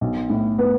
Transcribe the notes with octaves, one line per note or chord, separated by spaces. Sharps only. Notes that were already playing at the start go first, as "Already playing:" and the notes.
B1
A2
B3